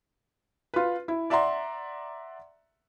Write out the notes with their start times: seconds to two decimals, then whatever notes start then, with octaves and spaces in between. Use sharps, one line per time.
0.74 F4 B4
1.08 E4
1.30 D5 E5 F#5 A#5 C6